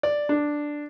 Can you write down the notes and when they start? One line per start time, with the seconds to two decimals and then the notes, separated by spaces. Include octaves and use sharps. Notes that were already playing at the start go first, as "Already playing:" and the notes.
0.03 D5
0.29 D4